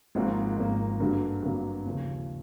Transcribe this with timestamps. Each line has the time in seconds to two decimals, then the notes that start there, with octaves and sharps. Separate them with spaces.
0.15 G#1 G#2 F3 A#3
0.58 G#1 G#2 F3 A#3
1.00 G2 D3 F#3 A#3
1.42 G2 D3 F#3 A#3
1.85 D#2 C#3 F3